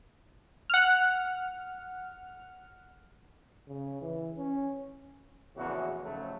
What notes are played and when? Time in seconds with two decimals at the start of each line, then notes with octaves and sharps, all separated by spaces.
0.70 F#5 F6
3.68 C#3
4.01 E3
4.38 C#4
5.56 A#1 E2 A2 C#3 E4 F#4
6.03 F2 G#2 C#3 F#3 A3